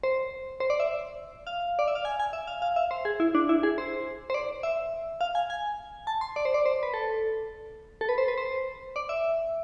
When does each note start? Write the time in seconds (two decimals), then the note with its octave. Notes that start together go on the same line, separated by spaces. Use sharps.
0.03 C5
0.60 C5
0.70 D5
0.80 E5
1.47 F5
1.79 D5
1.88 E5
1.95 F5
2.05 G#5
2.20 G#5
2.33 E5
2.47 F5
2.62 F5
2.76 E5
2.91 C5
3.05 G#4
3.20 E4
3.35 D4
3.49 E4
3.63 G#4
3.78 C5
4.30 C5
4.34 D5
4.63 E5
5.21 F5
5.35 G#5
5.50 G#5
6.07 A5
6.21 C6
6.36 D5
6.45 C5
6.54 D5
6.66 C5
6.83 B4
6.94 A4
8.01 A4
8.09 B4
8.18 C5
8.28 B4
8.38 C5
8.96 D5
9.09 E5